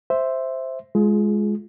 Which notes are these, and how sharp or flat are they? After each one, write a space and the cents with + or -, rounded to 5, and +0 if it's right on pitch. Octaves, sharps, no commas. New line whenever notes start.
C5 +0 E5 +0
G#3 +0 F4 +0 G#4 +30